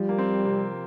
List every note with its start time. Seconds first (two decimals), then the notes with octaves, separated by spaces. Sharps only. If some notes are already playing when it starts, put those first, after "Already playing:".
Already playing: F3 G3
0.09 A#3
0.18 C4
0.45 C3